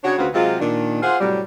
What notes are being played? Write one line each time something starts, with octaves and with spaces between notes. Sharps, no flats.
C#3 D4 F#4 C#5
D2 C#3 C4 F4 F#4 B4
C3 F#3 G#3 C4 F4
A#2 D#3 D4
F4 G#4 C5 F5 F#5
A2 C3 F#3 G3